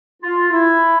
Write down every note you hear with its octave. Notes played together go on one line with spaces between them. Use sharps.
F4
E4